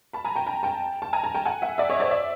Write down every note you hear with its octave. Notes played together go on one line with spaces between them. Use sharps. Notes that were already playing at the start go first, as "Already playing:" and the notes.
A5 B5
G#5 A#5
G5 A5
G#5 A#5
G5 A5
A5
G#5 A#5
G#5 A#5
G5 A5
F#5 G#5
E5 F#5
D5 E5
C#5 D#5
C5 D5
D5 E5